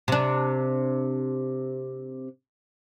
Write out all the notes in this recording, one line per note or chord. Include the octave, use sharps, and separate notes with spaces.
C3 D4